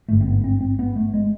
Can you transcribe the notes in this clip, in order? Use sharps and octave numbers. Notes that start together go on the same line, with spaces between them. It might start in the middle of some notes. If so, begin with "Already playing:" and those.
G#1 G2 D3 A3
C4
B3
C4
C4
B3
A3
G#3